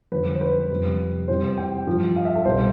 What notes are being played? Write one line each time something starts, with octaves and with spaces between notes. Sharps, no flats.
F2 D3 G3 B4
B4
C5
B4
F2 C3 G3
E2 C3 E3 G3 C5
G5
G2 F3
F5
E5
A4
C2 B2 G3 C5